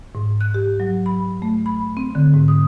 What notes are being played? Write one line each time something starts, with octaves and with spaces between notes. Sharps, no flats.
G#2
F#6
G4
F#3
B5
A3
B5
C4
D3
G#2
D#6